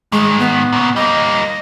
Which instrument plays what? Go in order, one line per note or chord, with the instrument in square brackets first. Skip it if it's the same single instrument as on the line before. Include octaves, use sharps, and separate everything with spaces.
[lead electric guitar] G#2 D#3 [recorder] G#3
[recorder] B3
[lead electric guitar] A#2 C#3
[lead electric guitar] G3 A#3 [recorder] D#5